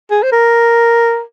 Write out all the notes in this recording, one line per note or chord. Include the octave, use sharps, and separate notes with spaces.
G#4
C5
A#4